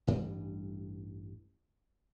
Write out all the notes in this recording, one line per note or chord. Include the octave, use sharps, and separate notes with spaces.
A1 G2 E3 G3